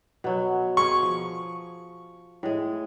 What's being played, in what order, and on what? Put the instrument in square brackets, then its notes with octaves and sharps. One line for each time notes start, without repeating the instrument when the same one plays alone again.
[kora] B2 F#3
[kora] G#4 [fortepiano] C#6
[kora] F3
A2 G#3